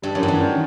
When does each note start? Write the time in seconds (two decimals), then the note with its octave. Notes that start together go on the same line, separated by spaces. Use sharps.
0.02 G2 G3
0.15 F#2
0.22 G2 E3
0.28 F#2
0.41 D#3